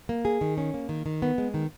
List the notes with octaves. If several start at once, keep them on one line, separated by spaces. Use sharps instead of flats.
A#3
G#4
D#3
C#4
A#3
D#3
D#3
B3
G#3
D#3